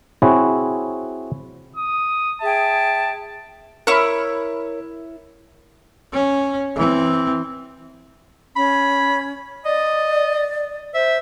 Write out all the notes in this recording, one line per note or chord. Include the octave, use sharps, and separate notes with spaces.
C4 E4 F#4 G#4 C#5
D#6
G#4 E5 G5 A5
E4 A#4 C#5 B5 C#6 E6 F6
C#4
E3 C4
C#4 B5
D5 D#5
C5 E5